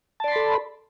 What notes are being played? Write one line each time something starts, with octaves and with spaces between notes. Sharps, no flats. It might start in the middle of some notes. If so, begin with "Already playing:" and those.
A4 D5 A5 B5 C6